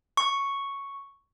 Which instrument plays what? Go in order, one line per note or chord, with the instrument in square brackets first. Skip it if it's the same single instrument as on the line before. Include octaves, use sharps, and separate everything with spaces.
[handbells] C#6